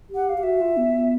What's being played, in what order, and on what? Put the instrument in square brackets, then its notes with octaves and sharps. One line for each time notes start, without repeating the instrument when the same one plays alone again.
[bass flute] G4
[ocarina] F#5
F5
[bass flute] G4
[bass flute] F#4 [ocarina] E5
[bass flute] F4
B3